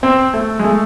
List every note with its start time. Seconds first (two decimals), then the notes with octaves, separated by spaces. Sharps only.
0.03 C4
0.34 A3
0.59 G#3
0.64 A3